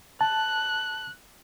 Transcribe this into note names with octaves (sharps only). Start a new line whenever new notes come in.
A5 F#6